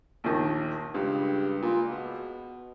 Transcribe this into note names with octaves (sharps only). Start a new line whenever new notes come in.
A#1 D#2 D#3
C#2 G2
A#2
B2